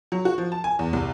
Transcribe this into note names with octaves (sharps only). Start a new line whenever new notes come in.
F#3
F#4
F3
A5
G#5
E2
C2